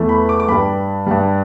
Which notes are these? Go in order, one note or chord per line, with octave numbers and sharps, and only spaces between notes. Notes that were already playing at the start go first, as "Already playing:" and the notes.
Already playing: E2 E3 A3
B5
D6
D6
G2 G3 B5
G2 G3